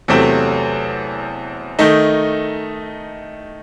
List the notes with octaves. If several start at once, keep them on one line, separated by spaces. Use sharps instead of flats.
E2 C3 F#3 A3 C4
D#3 A3 D#4